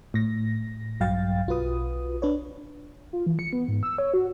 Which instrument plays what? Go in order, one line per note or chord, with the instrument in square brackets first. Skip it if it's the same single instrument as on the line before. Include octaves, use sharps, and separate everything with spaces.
[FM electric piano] A2 A#6
A#1 G2 F#3 F5 G5 A6
B1 F4 F#4 B4 D#6
D4 B4 C#5
[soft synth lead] F4
E3
C#7
B3
G#2
E6
C#5
F#4